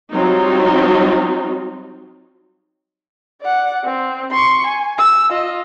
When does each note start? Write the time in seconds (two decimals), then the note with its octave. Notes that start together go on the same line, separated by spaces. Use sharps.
0.13 F#3 G3 C4 D#4 F4
3.41 D5 F#5
3.84 C4
4.31 C6 C#6
4.67 G#5
4.98 E6
5.30 F4 D#5